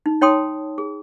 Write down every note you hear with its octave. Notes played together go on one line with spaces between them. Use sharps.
D#4
D#4 C#5 G5 A5 C6 D#6
G#4